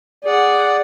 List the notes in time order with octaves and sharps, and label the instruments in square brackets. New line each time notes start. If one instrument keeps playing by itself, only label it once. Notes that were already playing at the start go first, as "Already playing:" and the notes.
[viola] G#4 F#5 [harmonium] D5